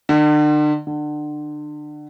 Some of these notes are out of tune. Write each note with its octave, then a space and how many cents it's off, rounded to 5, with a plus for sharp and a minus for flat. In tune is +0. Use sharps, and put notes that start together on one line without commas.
D3 +40
D3 +30